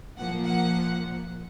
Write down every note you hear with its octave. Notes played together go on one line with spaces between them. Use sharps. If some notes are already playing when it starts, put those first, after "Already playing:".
A#2 F3 A#3 F#5
F#5